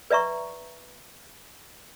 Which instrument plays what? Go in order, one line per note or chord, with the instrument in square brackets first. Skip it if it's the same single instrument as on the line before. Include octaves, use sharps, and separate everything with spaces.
[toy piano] B4 D5 E5 A#5 C#6